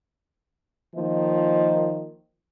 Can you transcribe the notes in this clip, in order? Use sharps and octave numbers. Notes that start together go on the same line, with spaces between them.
D#3 F3 A#3 D#5